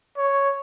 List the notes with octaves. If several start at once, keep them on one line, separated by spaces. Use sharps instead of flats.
C#5